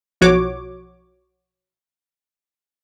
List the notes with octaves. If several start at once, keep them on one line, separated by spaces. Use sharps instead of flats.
B1 F3 F#4 C#5 D6